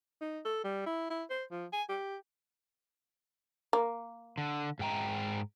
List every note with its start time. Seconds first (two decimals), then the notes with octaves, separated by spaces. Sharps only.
0.21 D#4
0.45 A4
0.64 G3
0.86 E4
1.10 E4
1.30 C5
1.51 F3
1.73 G#5
1.89 G4
3.73 A#3
4.38 D3
4.79 G#2 G5 A#5